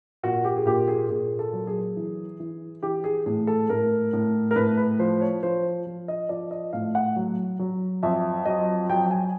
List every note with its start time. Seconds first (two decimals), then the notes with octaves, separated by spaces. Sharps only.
0.23 A#2 F#4
0.45 G4
0.56 G#4
0.66 A#2 G4
0.88 G#4
1.09 A#2 G#4
1.39 A4
1.53 F#3
1.67 G#4
1.97 E3
2.40 E3
2.83 E3 G4
3.04 G#4
3.26 A2 G#4
3.47 A4
3.69 A2 A#4
4.13 A2
4.51 A#4
4.56 A2 B4
4.77 B4
4.99 F3 C5
5.22 C#5
5.43 F3 C5
5.86 F3
6.08 D#5
6.29 F3 D5
6.51 D#5
6.73 A2 F5
6.95 F#5
7.16 F#3
7.59 F#3
8.03 F2 E5
8.45 F#3 D#5
8.89 F#3 G5
9.06 G5
9.11 G#5